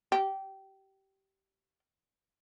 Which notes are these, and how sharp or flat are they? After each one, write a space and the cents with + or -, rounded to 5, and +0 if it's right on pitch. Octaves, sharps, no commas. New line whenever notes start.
G4 -20